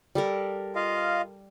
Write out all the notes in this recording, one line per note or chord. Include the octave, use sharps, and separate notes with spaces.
G3 A4 A#4
F4 D#5 F5